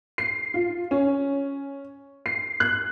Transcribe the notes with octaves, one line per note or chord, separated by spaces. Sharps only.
C7
F4
C#4
C7
F#6